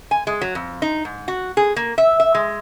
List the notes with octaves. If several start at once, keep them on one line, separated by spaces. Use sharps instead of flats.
G#5
G#3
F#3
F2
D#4
G#2
F#4
G#4
A#3
E5
E5
G#3